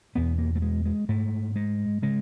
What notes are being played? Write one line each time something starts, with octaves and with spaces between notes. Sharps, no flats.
E2 B2 B3
A#3
A3
G#3
G#3
G#2 A3
G#3
C#3 G#3